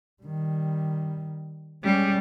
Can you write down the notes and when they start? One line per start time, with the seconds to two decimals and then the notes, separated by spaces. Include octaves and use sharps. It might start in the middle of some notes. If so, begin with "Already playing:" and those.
0.23 D#3 G3
1.84 G3 G#3 C#4